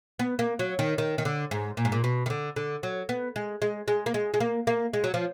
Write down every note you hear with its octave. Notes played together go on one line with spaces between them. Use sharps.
B3
A#3
F#3
D#3
D#3
D#3
D3
G#2
A#2
G#2
A#2
B2
D#3
D3
D3
F#3
B3
G#3
G#3
G#3
A#3
G#3
G#3
A#3
A#3
G#3
F#3
F3